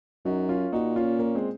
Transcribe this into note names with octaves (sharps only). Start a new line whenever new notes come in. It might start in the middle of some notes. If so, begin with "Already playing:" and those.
F#2 D#4 F#4
C#4 F4
A#2 D#4 F#4
C#4 F4
A#3 C#4
G#3 C4